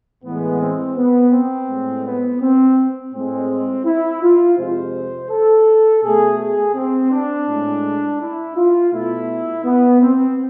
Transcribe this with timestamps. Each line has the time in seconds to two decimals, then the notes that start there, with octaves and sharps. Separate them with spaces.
0.24 A2 E3 G#3 B3
0.61 C4
0.97 B3
1.32 C4
1.68 A2 G#3
2.06 B3
2.41 C4
3.14 A2 G#3 C4
3.85 E4
4.22 F4
4.58 F2 C3 G#3 C5
5.30 A4
6.03 B2 A3 G#4
6.39 G#4
6.75 C4
7.12 D4
7.48 A2 G#3
8.20 E4
8.57 F4
8.92 B2 A3 E4
9.65 B3
10.01 C4